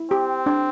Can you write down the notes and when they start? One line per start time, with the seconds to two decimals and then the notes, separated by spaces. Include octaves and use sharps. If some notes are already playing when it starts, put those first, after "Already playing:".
Already playing: E4
0.11 C4 G4
0.46 D4